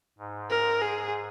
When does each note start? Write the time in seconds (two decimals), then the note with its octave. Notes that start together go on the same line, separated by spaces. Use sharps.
0.18 G#2
0.50 A#4
0.81 G#4